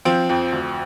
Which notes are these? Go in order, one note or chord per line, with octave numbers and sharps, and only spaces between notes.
F3 C4
F2
D2